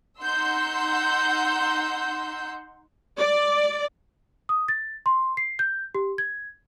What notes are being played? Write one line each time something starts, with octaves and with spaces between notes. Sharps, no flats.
D#4 F#5 C6 E6 G6
D5
D#6
A6
C6
C7
G6
G4
G#6